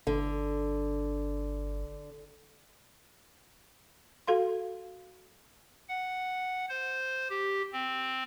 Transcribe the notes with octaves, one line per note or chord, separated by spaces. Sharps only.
G1 D3
F#4 A4 F5 C6
F#5
C5
G4
C4